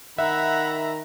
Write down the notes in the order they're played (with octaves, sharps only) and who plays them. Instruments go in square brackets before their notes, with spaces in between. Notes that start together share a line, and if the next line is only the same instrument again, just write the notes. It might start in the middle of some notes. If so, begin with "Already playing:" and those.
[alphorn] D#3 [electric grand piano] E5 [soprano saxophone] F#5 [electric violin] A#5 B5